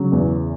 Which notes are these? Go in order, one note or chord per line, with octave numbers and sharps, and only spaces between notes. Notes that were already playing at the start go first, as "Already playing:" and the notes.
Already playing: C#3 F#3
E2